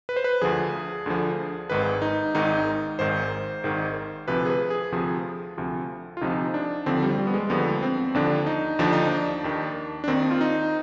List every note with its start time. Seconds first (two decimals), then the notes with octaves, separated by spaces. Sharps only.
0.09 B4
0.16 C5
0.24 B4
0.41 D2 D3 F3 G#4
1.06 D2 D3 F3
1.70 G#1 G#2 D#3 B4
2.02 D#4
2.35 G#1 G#2 D#3 D#4
2.99 G#1 G#2 D#3 C5
3.64 G#1 G#2 D#3
4.28 D2 C3 F3 B4
4.45 G#4
4.50 B4
4.70 G#4
4.92 D2 C3 F3 G#4
5.58 D2 C3 F3
6.17 F4
6.21 D2 C3 F3 D#4
6.54 D4
6.86 D#2 D3 F3 C4
7.03 G3
7.18 G3
7.27 B3
7.34 G#3
7.50 D#2 D3 F3 B3
7.82 C4
8.14 D#2 D3 F3 D4
8.46 D#4
8.79 D#2 D3 F3 D4
8.93 D#4
9.07 D4
9.44 D#2 D#3
10.04 D4
10.08 D#2 D#3 C4
10.31 F4
10.41 D#4